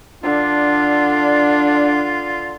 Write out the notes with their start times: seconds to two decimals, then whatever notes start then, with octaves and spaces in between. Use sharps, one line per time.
0.23 D3 D4 F4